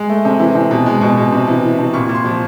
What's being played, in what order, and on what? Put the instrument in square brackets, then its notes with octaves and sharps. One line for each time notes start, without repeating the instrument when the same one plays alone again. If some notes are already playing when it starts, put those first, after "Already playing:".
Already playing: [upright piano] G#3
A3
C3
E3
C3
B2
G#3
B2
B2
C3
E3
E3
C3
A#2 C#6
A#2
C6
F3